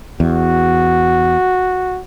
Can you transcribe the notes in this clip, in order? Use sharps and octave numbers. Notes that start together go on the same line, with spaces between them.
E2 F#4